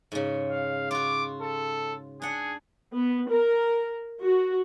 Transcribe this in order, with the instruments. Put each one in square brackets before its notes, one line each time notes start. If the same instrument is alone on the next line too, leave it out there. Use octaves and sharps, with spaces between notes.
[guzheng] G#2 C#3
[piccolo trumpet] F5
[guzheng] F4 F#4 [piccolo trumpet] D6
[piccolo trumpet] A4
[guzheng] D4 F#5 [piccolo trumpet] G#4
[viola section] B3
A#4
F#4